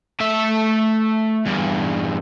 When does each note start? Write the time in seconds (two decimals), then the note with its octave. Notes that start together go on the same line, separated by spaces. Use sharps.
0.20 A3 E5
1.46 E2 G2